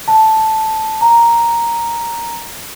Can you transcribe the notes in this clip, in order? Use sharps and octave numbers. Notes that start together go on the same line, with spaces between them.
A5
A#5